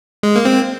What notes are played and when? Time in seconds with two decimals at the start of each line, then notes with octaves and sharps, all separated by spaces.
0.23 G#3
0.36 A#3
0.45 C4